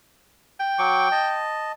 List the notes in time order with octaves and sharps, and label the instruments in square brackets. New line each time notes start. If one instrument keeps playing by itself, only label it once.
[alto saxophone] G5
[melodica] F#3 C#6 D6
D#5 A5